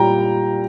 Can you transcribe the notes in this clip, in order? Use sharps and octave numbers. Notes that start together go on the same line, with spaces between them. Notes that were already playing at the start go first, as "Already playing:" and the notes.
Already playing: A#2 G3 G5 A#5